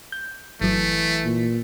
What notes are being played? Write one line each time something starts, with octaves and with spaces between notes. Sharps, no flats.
G6
G1 E3 F#3 A3
A#2